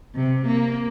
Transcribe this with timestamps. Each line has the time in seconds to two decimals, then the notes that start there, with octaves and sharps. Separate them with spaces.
0.16 C3
0.46 A#3